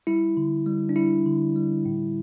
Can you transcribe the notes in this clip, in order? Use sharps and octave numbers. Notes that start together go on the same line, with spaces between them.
G3 E4
D3
G3
D4
G3 E4
D3
G3
A2